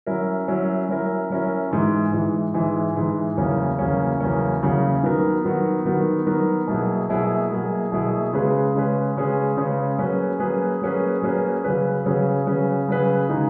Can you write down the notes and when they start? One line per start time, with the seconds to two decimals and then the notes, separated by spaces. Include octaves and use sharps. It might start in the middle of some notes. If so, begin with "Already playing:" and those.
0.06 F#3 C#4 E4 A#4
0.48 F#3 C#4 E4 A#4
0.89 F#3 C#4 E4 A#4
1.30 F#3 C#4 E4 A#4
1.71 G#2 E3 G#3
2.13 G#2 E3 G#3
2.54 G#2 E3 G#3
2.96 G#2 E3 G#3
3.37 E2 C#3 F#3 A#3 C#4
3.78 E2 C#3 F#3 A#3 C#4
4.20 E2 C#3 F#3 A#3 C#4
4.62 E2 C#3 F#3 A#3 C#4
5.03 D#3 F#3 B3 F#4 A#4
5.44 D#3 F#3 B3 F#4 A#4
5.85 D#3 F#3 B3 F#4 A#4
6.26 D#3 F#3 B3 F#4 A#4
6.67 B2 F#3 A#3 E4 G#4
7.09 B2 F#3 A#3 E4 G#4
7.50 B2 F#3 A#3 E4 G#4
7.92 B2 F#3 A#3 E4 G#4
8.33 C#3 G#3 C#4 G#4 B4
8.74 C#3 G#3 C#4 G#4 B4
9.16 C#3 G#3 C#4 G#4 B4
9.57 C#3 G#3 C#4 G#4 B4
9.99 F#3 A#3 C#4 G#4 B4
10.39 F#3 A#3 C#4 G#4 B4
10.81 F#3 A#3 C#4 G#4 B4
11.22 F#3 A#3 C#4 G#4 B4
11.64 C#3 F#3 C#4 G#4 B4
12.05 C#3 F#3 C#4 G#4 B4
12.47 C#3 F#3 C#4 G#4 B4
12.88 C#3 F#3 C#4 G#4 B4
13.29 C#3 G#3 D#4 G#4